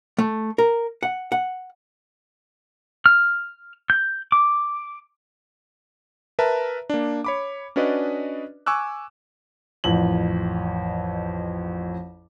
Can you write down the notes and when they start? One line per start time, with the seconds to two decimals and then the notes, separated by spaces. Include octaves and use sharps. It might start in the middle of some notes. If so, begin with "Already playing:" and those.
0.18 A3
0.58 A#4
1.03 F#5
1.32 F#5
3.06 F6
3.90 G6
4.32 D6
6.39 A#4 B4 E5 A5 A#5
6.90 A#3 D4
7.24 C#5 B5 D6
7.76 C#4 D4 F#4 B4 D5 D#5
8.66 G#5 C#6 D6 E6 F#6
9.84 A1 F2 F#7